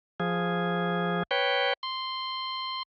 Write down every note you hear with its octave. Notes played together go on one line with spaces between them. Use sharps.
F3 G#4
B4 C#5 G5
C6